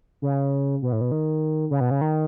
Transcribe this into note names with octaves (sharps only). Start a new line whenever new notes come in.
C#3
B2
A2
B2
D#3
C#3
B2
C#3
D#3